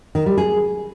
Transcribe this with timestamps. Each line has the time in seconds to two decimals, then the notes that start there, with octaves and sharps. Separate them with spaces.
0.15 D#3
0.26 G3
0.38 G#4